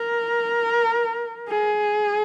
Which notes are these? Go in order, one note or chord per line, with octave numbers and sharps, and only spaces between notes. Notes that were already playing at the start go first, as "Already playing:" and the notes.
Already playing: A#4
G#4